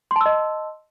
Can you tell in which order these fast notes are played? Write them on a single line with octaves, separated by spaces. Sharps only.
C6 A5 E6 D#5